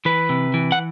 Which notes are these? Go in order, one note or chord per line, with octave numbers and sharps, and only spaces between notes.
E3 B4
C3
E3
F#5